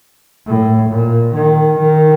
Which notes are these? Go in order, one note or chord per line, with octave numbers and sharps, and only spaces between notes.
A2
A#2
D#3
D#3